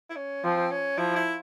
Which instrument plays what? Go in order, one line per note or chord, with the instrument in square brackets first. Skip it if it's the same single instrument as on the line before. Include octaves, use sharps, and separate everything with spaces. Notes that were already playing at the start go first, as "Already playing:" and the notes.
[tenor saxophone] E4
C#4
[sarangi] F3 [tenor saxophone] C4
[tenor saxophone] C#4
[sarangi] F3 [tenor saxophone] E4
[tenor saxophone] E4